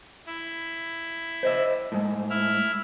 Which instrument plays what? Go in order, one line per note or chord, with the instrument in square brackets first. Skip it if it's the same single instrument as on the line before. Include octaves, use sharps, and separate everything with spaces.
[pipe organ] E4
[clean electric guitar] C5 D#5 E5
A2 G#3
[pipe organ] E4 E5 F6